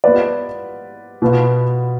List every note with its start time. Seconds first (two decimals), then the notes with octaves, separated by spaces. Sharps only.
0.04 B3 F4 B4 D5
1.22 B2 B3 F4